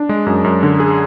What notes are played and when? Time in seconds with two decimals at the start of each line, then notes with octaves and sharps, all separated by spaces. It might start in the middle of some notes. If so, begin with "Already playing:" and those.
Already playing: D4
0.09 G#3
0.27 F#2
0.44 F#2
0.63 D3
0.80 G#4